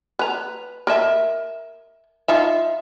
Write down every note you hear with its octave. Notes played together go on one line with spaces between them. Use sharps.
B4 A#5
A#4 D#5 E5
D#4 F4 E5